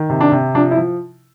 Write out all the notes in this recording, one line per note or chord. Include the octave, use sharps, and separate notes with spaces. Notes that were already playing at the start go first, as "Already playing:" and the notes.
Already playing: D#3
C3
D4
C3
F3 D4
E4
F3